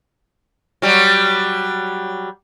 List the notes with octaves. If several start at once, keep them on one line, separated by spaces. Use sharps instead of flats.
F#3 G3